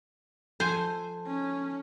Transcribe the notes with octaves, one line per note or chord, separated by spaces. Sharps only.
F3 A4 C5 G#5
C#4